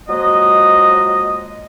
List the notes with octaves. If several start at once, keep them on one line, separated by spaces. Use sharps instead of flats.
F3 F#3 G#3 A#3 D#5